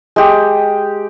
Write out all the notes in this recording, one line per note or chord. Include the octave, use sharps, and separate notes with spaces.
G#3 G4